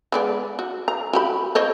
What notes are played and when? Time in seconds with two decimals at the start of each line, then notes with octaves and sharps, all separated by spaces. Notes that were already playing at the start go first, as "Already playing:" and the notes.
0.12 G#3 B3 D5
0.59 F#4
0.88 A#5
1.13 F#4 G4 B5
1.55 C5 C#5 D#5